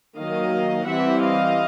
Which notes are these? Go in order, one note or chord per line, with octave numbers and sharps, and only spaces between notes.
D#3 F#3 A#3 D#5 F5
E3 G3 C4 E5 F#5
D#5 F5